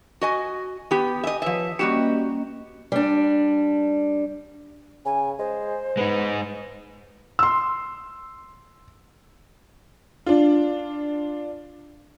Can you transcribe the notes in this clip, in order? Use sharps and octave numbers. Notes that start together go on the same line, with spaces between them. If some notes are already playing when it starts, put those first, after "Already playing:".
F#4 D#5 G#5
B3 G4
D#5 E5 G#5
F3 B4 C#5 E5
G3 A#3 C#4 F#4 G4 D#5
G3 D4
C#3 G#5
G#3 C5
G#3 B3 D#4
C6 E6
D4 F4